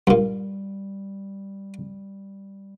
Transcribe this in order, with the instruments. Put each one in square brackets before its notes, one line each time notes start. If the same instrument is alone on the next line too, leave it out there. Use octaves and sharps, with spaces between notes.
[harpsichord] G2 A#2 [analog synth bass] G3